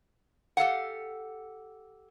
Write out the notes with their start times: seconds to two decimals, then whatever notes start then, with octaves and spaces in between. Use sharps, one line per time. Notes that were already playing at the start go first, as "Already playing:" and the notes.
0.57 G4 A4 F5 F#5